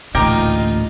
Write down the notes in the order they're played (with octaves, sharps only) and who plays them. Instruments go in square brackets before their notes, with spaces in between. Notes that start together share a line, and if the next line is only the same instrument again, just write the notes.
[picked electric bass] A1 D2 [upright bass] A#2 [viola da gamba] A#3 D#4 F4 [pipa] G4 A#4